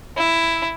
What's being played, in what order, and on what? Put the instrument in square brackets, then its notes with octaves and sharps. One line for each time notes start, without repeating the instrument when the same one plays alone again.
[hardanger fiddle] E4